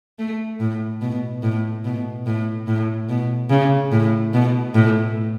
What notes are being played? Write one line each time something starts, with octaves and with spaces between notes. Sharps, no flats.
A3
A2
B2
A2
B2
A2
A2
B2
C#3
A2
B2
A2